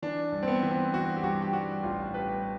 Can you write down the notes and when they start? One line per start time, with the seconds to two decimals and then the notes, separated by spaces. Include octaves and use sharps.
0.02 E3 D4
0.32 G2
0.43 C4
0.48 B3
0.63 E3
0.71 C4
0.94 E3 F#4
1.17 G4
1.23 G2 F#4
1.42 G4
1.53 G3 F#4
1.83 A1 F4
2.14 G3 B4